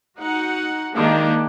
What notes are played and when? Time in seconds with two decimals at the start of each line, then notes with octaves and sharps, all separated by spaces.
0.19 D#4 F#4 F#5
0.95 D#3 G#3 A#3 D4 G4